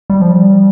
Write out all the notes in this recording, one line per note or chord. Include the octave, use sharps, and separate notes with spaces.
G3
F3
G3